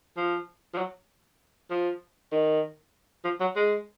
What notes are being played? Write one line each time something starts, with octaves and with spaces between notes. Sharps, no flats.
F3
F3
F#3
F3
D#3
F3
F#3
G#3